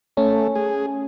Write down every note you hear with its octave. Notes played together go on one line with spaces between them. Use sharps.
A3 C#4
G#4